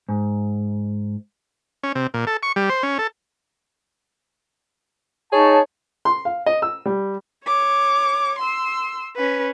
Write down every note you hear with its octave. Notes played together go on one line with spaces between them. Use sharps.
G#2
C#4
C3
A#2
A4
C#6
G3
C5
C#4
A4
D#4 G#4 C#5 A5
C6
F5
D#5
E6
G3
C#5 D6
C6 E6
C#4 B4